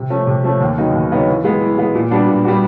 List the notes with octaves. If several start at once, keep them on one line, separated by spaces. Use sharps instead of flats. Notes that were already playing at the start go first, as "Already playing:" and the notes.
Already playing: C3
F3 A3 C#4
C3
F3 A3 C#4
D#2
C#3 F#3 B3 D#4
D#2
C#3 F#3 B3 D#4
E3
G#3 B3
E3
G#3 B3
A#2
G3 B3 D4 F#4
A#2
G3 B3 D4 F#4